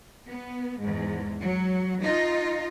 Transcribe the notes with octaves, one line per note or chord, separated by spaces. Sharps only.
B3
E2 G#2
F#3
D#4 F4 D#5